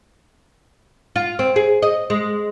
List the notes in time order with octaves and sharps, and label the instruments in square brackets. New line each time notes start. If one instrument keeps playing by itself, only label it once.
[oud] F4
C4
G#4
D#5
G#3